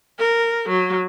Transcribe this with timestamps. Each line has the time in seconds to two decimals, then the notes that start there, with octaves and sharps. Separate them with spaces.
0.19 A#4
0.69 F#3